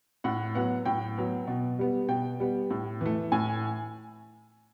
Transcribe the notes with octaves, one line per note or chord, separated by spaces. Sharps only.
A2 F#5
F#3 B3 F#5
A2 G5
F#3 B3
B2
G3 B3
B2 G5
G3 B3
A2
E3 A3
A2 G#5